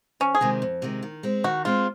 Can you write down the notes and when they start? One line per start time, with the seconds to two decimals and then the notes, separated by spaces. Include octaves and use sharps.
0.20 F2 C#4
0.35 G#4
0.41 C3 D#3 G#3
0.62 F2
0.82 C3 D#3 G#3
1.03 D#3
1.23 G#3 C4
1.44 D#3 F#4
1.65 G#3 C4 F4